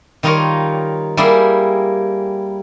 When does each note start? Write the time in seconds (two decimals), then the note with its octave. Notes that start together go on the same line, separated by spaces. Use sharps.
0.23 D#3 G3 D#4 F4 A#4 C#5
1.17 G3 A#3 E4 G4 G#4